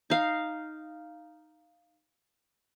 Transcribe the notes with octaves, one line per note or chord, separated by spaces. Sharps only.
D#4 F5